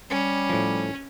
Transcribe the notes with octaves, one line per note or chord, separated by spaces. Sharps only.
G3 C#4
A2 F3